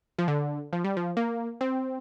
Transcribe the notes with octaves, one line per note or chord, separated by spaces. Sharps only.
F3
D3
F3
G3
F3
A#3
C4